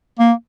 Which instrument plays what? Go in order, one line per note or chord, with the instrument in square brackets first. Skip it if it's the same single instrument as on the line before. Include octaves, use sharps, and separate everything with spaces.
[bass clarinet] A#3